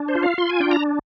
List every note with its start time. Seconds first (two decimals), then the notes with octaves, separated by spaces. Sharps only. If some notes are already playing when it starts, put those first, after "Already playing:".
Already playing: D4
0.08 C5
0.15 F4
0.23 F5
0.38 F4 C6
0.50 G#5
0.60 D4 G5
0.71 A#5